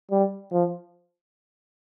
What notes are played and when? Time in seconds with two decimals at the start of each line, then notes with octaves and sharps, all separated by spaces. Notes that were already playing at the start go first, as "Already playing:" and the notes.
0.11 G3
0.52 F3